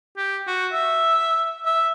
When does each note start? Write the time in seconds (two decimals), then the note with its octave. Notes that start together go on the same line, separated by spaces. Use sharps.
0.17 G4
0.47 F#4
0.72 E5
1.66 E5